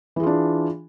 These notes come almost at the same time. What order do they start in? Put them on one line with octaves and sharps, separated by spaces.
E3 G#4 F4 D4